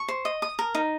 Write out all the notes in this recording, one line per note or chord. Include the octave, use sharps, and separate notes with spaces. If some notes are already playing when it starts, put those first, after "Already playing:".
Already playing: C#6
C5
D#5
D#6
A#4
D#4